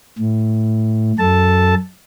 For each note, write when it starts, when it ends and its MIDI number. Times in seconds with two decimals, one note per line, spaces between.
0.19 1.12 45
1.19 1.75 42
1.19 1.75 69
1.19 1.75 81